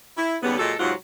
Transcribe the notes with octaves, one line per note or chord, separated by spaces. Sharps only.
E4
D#2 C#3 G3 B3
A#2 F#3 G#3 A4
G#2 C3 F#3 C4 F4 F#5